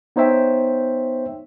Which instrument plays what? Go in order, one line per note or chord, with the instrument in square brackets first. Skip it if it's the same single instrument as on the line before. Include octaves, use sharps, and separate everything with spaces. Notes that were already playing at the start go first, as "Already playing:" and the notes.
[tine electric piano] B3 D#4 C5 C#5 E5 G5